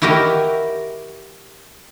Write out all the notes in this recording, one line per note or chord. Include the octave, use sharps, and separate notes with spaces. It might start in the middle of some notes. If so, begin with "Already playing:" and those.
E4 F#4 G4 A#4 D#5